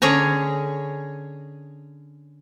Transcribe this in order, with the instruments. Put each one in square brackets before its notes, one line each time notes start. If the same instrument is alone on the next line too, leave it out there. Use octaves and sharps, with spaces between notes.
[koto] D3 C#4 G#4 C#5 A#5